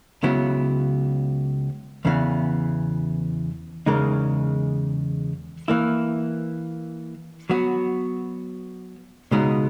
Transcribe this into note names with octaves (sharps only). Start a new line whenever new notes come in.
C#2 C#3 F#3 B3 E4
E2 C#3 E3 B3
E2 C#3 G#3 D#4 A#4
E3 A#3 E4
F#3 B3 F#4
C#2 B2 G#3 B3 D#4